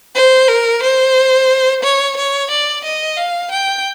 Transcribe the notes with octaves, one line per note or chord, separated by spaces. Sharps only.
C5
A#4
C5
C#5
C#5
D5
D#5
F5
G5